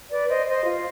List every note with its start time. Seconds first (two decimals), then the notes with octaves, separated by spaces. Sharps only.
0.10 B4 D5
0.28 C5 D#5
0.47 C5 D#5
0.66 F4